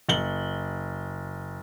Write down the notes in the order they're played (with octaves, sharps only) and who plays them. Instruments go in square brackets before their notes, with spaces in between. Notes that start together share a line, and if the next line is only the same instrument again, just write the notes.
[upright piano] F#1 F#7 G7